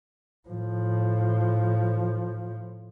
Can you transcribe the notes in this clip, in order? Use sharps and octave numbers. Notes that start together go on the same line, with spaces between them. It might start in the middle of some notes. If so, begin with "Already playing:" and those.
A2 F3